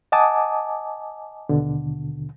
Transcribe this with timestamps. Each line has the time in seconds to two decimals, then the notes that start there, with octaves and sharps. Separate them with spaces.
0.12 D#5 F#5 G#5 A5 D6 D#6
1.49 D#2 B2 D3